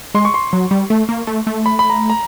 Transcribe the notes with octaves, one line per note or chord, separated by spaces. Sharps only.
G#3 C6
C#6
C6
F#3
G3
A3
A#3
A3
A3
B5
B5
A#5
A#5